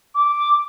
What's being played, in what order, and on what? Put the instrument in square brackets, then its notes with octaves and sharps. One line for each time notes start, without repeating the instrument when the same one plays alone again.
[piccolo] D6